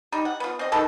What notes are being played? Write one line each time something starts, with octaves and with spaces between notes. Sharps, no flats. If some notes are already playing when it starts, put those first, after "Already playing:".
G3 D#4
F#5
B3 F4
C4 D#5
D#3 A4 B4